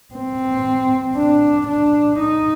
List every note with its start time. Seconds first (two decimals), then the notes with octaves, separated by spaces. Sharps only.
0.14 C4
1.16 D4
1.68 D4
2.19 D#4